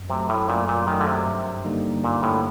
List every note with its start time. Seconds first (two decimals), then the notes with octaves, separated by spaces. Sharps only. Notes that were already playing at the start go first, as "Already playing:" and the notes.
Already playing: F#2
0.10 C3 F#3 A3
0.29 A2
0.48 F#2 A#2
0.68 A#2
0.87 D#3 F#3 A3
1.00 D3
1.07 C3
1.26 G2
1.65 D3 G3 A#3 D#4
2.03 G2 A#2
2.23 A2